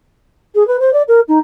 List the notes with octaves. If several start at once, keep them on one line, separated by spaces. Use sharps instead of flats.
G#4
B4
C5
D5
A#4
D#4